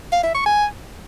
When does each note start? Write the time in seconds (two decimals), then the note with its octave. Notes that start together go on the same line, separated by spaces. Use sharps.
0.12 F5
0.24 E5
0.35 C#6
0.46 G#5